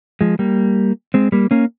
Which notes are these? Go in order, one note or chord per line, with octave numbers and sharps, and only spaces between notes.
F3 G#3
G3 A#3
G#3 C4
G3 A#3
A#3 C#4